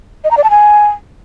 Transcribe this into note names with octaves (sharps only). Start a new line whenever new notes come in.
D#5
A#5
D5
A5
G#5